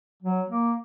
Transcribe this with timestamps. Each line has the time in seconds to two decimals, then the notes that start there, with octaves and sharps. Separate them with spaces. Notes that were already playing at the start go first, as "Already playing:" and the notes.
0.23 F#3
0.49 A#3